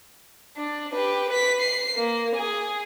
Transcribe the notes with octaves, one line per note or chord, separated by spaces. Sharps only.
D4
G4 B4
B4 B6
C7
A#3
G#4